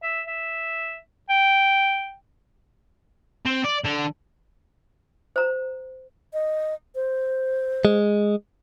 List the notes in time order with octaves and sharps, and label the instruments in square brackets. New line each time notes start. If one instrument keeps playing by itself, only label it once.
[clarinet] E5
E5
G5
[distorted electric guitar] C4
D5
D3
[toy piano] C5 A#5
[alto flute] D#5
C5
[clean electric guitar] G#3